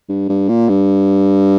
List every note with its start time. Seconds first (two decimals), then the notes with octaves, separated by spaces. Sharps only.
0.09 G2
0.29 G2
0.49 A#2
0.69 G2